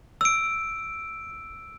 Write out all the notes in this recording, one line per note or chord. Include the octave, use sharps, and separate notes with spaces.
E6 D7